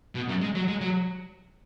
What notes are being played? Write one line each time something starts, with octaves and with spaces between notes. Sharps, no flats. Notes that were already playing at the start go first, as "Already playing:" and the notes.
B2
F#2
G#3
F#3
G#3
F#3